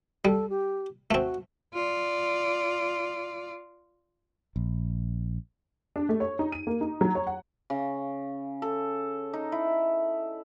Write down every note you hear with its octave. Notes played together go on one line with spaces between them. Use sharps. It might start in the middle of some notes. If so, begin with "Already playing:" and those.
G3 A4
G4
A3 C4 F#4
F4 D5
A#1
D4
A3
C#5
D#4
D#7
A#3
D#4
F#3
C#5
F#5
C#3
A4
D#4
E4